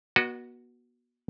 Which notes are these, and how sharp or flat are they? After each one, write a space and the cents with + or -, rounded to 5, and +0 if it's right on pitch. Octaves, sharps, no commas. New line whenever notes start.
B3 -40 F#4 +0 D#5 -45